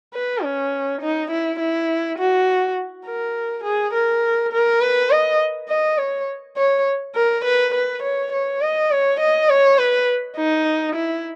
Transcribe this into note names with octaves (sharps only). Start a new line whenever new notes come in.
B4
C#4
D#4
E4
E4
F#4
A#4
G#4
A#4
A#4
B4
D#5
D#5
C#5
C#5
A#4
B4
B4
C#5
C#5
D#5
C#5
D#5
C#5
B4
D#4
E4